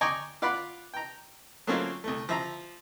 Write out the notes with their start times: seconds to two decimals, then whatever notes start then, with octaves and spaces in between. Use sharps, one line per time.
0.01 D5 D#5 G5 G#5 A#5 C#6
0.42 F4 D5 F#5 B5
0.94 G5 A#5
1.67 F#3 A3 A#3 C4 C#4 F4
2.04 C2 A3
2.29 F3 E5 A#5